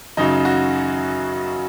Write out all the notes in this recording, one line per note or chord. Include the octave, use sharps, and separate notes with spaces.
F#2 C#3 F#3 D#4
F#4